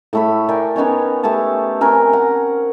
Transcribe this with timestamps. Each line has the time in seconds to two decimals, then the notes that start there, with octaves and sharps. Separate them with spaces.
0.13 A2 A3 B5
0.49 A#4 D5 G5 G#5
0.76 B3 C#4 D#4 C#5
1.23 A3 G4 G#5 A5
1.81 C4 C#4 A#4 G#5
2.13 F#5